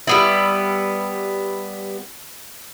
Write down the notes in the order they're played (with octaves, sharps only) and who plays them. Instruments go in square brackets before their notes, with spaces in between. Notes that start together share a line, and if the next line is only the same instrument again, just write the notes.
[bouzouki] G3 B3 E4